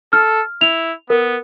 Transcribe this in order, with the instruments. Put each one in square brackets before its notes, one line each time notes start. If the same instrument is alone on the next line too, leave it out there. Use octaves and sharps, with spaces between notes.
[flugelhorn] A4 [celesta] F6
[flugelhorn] E4 [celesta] F7
[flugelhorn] B3 [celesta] A#4